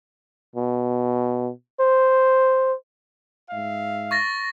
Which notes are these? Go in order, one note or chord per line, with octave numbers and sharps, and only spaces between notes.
B2
C5
G#2 E5 F5
C#6 A6 A#6